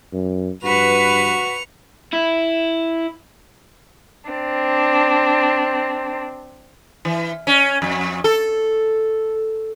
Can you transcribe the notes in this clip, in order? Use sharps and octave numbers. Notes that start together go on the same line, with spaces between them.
F#2
G2 F#4 B4 C#7 F7
E4
C4 D4
E3
C#4
F2
A4